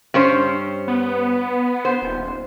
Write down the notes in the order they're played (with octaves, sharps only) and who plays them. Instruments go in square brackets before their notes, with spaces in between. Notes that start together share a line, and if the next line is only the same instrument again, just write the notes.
[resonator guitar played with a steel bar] G2 C#4 C5
[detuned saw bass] B3
[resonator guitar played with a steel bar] C5
[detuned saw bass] D#1